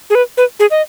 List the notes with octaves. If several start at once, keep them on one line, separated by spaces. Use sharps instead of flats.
G#4
B4
B4
G#4
D#5